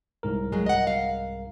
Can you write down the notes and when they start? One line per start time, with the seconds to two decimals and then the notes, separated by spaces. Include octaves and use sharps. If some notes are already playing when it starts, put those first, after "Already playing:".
0.23 C2 G#2 A#4
0.52 F#3 G#3
0.66 D#5 F#5
0.87 F5